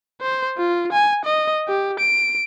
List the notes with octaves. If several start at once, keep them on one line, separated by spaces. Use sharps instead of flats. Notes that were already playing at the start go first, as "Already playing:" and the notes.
C5
F4
G#5
D#5
G4
D7